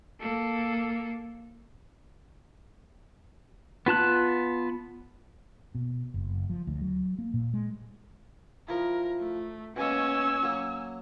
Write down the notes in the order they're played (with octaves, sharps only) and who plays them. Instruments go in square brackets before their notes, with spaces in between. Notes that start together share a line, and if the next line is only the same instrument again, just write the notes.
[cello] A#3 A4
[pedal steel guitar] B3 F4 A5 F#6
[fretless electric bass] B2
F#1
F3
D2
F#3
A#3
A#2
G#3
[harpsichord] F3 E4 [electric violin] A#4
[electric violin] A3
[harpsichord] B2 G#3 A#3 [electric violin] C#4 C#5 [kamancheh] G#5 E6
[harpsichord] F#3 A#3